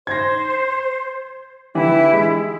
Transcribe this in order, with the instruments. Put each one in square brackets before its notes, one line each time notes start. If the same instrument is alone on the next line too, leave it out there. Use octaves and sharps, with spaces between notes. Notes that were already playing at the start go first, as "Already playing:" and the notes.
[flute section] C5 [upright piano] G#6 A#6
[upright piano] D3 E3 G4 [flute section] E4
[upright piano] G#3